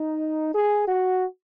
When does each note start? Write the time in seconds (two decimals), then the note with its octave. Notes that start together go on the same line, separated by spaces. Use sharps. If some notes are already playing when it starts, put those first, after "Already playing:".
Already playing: D#4
0.53 G#4
0.88 F#4